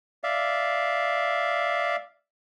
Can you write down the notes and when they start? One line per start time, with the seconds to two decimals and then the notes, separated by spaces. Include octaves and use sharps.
0.24 D5 E5 F5